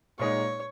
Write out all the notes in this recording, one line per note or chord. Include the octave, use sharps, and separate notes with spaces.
A#2 G#3 D#4 C#5